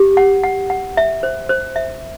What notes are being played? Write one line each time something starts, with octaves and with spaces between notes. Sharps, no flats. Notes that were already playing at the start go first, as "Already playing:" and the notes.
Already playing: G4
F#5
F#5
F#5
E5
C5
C5
E5